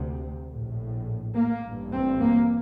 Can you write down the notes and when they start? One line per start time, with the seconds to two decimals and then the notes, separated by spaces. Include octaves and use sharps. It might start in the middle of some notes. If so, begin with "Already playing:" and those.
Already playing: D2 C3
0.50 A#1 A2
1.37 A#3
1.64 A1 G2
1.93 C4
2.22 A#3